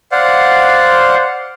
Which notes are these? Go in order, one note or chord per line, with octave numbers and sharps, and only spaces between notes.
C5 D5 F5 F#5